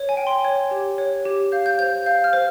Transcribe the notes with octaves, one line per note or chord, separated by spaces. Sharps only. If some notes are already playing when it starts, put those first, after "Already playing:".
Already playing: C#5
G#5
G5
C6
C#5 G#6
G4
C#5
G4
F5 G6
G6
C5 G6
F5 G6
F6
C5